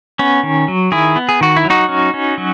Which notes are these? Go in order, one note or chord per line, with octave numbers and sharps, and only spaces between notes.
B3 C#4
D#3
F#3
D#3 E4 G#4
B3
G#4
D#3 F#4
E4
F#3
D#4 F#4
C#4
C#4
F#3